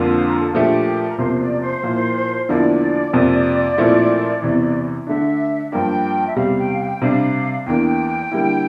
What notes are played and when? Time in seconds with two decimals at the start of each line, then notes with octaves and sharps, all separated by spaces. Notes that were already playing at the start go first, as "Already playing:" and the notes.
Already playing: F2 D3 F3 A#3 D4 F4
0.13 C5
0.27 A#4
0.40 A4
0.53 A#2 F3 A3 D4 G4
1.08 A#4
1.18 E2 C3 F3 A#3 C5
1.40 D5
1.62 C5
1.83 A#2 F3 A#3 E4
2.48 E2 D3 F3 A#3 E4 D5
3.13 F2 C3 F3 A#3
3.78 A#2 F3 A3 C4 E4
4.42 E2 C3 E3
5.07 D3 A3 D4 E5
5.72 G2 F3 A#3 D4 G5
6.27 E5
6.36 E2 C3 G3 F5
6.58 G5
6.70 F5
6.80 G5
7.01 C3 G3 D4 F5
7.66 E2 E3 A#3 D4 G5
8.31 D3 G3 A#3 E4